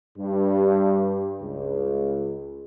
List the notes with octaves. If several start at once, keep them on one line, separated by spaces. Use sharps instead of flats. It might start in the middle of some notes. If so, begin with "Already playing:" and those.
G2
C#2